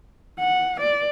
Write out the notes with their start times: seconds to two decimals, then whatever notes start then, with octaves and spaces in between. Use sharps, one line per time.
0.39 F#5
0.80 D5